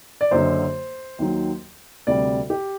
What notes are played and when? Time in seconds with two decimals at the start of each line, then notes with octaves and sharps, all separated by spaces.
0.21 D5
0.31 F#1 F#2 D3 F#3 C5
1.19 D#2 D#3 F#3
2.07 D2 C3 G3 D5
2.50 G4